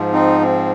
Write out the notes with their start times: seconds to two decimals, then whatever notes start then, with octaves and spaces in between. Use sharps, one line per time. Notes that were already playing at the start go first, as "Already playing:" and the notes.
Already playing: G#2 F3
0.13 C4 D#4
0.41 C4